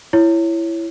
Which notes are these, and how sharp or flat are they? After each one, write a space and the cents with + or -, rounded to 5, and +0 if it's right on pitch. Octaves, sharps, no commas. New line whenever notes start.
E4 +15 C#5 +0